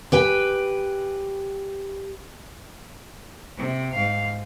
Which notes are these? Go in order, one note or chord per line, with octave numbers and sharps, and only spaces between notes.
G4 B4 G5 G#5
C3
G#2 F5